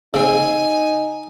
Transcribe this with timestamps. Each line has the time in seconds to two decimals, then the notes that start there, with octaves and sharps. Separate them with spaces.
0.14 C#3 C4 D#4 G#5